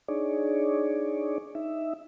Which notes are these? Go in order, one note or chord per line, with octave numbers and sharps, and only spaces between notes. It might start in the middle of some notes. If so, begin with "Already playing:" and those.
D4 D#4 G#4 C#5 D5
D#4 E5